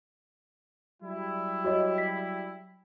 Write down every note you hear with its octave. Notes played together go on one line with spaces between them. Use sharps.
F#3 G3 E4
F#4 C#5 D#5
B6